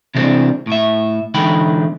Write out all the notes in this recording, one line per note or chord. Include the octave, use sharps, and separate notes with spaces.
C3 E3 G3 G#3 C4 D4
A2 E5
D3 E3 G#3 D#4 G5 B5